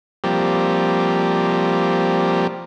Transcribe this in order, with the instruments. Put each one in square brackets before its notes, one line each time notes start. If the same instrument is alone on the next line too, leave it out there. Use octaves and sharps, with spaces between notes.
[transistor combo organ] F3 G3 A#3 C4 G4 D5